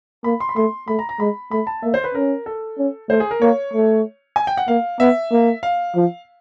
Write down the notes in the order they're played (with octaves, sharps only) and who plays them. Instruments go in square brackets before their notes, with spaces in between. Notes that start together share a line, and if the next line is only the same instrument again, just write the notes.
[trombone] A#3 [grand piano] B5
[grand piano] C6
B5
[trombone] A3 [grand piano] C6
[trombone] A3 [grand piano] B5
[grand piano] A#5
A#5
[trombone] G#3 [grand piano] B5
[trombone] A3 [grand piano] B5
[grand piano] A5
[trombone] A#3 [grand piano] E5
[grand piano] C5
B4
[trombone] C#4 [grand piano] A#4
[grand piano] A4
[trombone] C#4
[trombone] A3 [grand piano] C5
[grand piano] G#4
A#4
[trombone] A#3 [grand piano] C#5
[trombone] A3
[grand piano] G#5
G5
F#5
[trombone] A#3 [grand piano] F5
[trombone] B3 [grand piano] E5
[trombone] A#3
[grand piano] F5
[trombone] F3